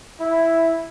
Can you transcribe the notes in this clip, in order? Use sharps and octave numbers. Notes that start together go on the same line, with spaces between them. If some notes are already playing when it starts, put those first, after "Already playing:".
E4